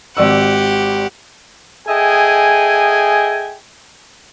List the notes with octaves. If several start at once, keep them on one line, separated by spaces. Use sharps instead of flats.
G#1 G4 D5 F#5 E6
G#4 A4 D#5 E5 G5 G#5